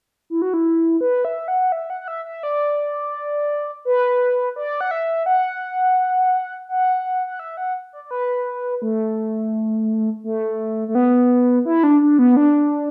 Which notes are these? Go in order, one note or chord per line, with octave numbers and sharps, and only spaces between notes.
E4
F#4
E4
B4
E5
F#5
E5
F#5
F#5
E5
E5
D5
B4
D5
F#5
E5
F#5
F#5
F#5
E5
F#5
D5
D5
B4
A3
A3
A3
B3
E4
D4
D4
B3
D4